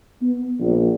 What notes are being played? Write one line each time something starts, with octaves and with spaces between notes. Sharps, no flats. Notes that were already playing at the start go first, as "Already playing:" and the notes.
B3
A#1